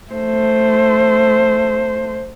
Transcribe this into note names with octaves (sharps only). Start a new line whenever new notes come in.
A3 C5